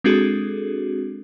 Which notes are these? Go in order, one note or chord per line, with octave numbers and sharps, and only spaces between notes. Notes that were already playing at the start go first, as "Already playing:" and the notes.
G#3 C4 D4 F#4 G#4 A4